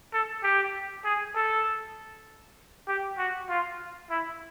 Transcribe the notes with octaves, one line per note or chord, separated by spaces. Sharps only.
A4
G4
G#4
A4
G4
F#4
F4
E4